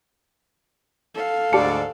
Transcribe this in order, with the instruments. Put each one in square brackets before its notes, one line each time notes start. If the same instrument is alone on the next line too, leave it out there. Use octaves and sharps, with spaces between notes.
[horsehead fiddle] A4 F5
[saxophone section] D2 G#2 D5 [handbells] G4 A5 C#7